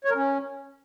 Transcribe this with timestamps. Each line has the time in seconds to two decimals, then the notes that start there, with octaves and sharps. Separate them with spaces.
0.05 C#5
0.10 A#4
0.15 C#4